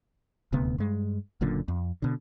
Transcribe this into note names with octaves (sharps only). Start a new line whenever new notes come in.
D#1 D2 C3 B3
G2 G#3
F#1 F#2 A#2 D3
F2
B2 D3